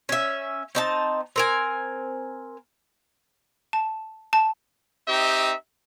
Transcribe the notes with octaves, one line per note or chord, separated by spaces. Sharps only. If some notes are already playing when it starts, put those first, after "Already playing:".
C#4 E5
C4 D#4 A5
C4 A#4 G#5
A5
A5
C4 D#4 G4 D#5 E5